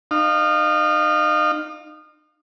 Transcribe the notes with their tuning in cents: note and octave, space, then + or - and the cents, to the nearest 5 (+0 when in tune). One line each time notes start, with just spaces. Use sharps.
D#4 -35 F5 +0